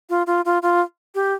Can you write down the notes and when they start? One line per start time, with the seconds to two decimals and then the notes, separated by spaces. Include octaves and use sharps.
0.10 F4
0.27 F4
0.45 F4
0.62 F4
1.15 G4